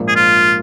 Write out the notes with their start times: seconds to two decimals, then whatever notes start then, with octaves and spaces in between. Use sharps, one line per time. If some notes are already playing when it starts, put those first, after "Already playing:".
Already playing: A#1 G#2 F3 A#3
0.08 G#4
0.16 F4